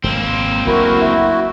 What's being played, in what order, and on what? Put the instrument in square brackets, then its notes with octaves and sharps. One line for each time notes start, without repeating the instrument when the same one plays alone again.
[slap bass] D1 G#1 [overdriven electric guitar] A#3 C4
[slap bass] F#1 D2 [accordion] E4 F#4 [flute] A#4
[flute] E5